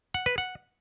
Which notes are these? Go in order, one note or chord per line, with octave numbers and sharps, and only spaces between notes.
F#5
B4
F#5